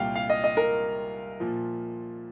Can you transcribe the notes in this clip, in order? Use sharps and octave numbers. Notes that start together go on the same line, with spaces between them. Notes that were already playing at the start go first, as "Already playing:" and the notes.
Already playing: C2 A#2 G3 F5 G5
F5
D#5
D#5
A#4
A#2 F3